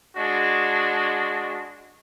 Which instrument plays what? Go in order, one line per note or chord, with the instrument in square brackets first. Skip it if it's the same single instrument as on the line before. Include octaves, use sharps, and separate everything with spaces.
[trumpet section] G#3 D4 F#4